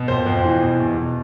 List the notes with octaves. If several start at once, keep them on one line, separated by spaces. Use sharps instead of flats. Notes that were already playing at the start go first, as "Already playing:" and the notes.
Already playing: B2
F2 C5
F2
E3
B2
E2
B2